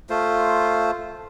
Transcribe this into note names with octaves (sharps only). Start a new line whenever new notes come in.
A3 F4 C5